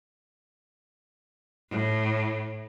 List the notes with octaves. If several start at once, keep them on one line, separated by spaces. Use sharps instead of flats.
A2